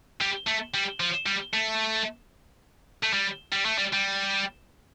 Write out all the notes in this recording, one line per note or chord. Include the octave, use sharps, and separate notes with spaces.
G3
A3
G3
F3
G3
A3
A3
G3
G3
A3
G3
G3